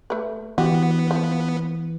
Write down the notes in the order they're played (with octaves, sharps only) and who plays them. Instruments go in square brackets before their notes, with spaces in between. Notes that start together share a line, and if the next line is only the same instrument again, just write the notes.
[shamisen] A3 B4
[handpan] E3 [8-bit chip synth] B3 [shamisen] F#4 G4
[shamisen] F3